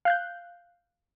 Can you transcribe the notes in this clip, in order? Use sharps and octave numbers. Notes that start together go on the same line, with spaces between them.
F5 F#6 G6